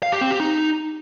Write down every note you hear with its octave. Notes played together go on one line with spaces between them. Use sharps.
F5
G4
C4
G4
D#4